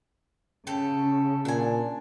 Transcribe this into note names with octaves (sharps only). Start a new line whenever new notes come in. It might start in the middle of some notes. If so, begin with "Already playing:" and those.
C#3 G4 A4
C#4
A#2 D4 G#5